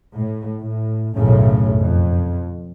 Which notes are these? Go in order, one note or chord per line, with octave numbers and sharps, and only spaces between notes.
A2
A2
B1 F#2 A2 C#3 A3
F2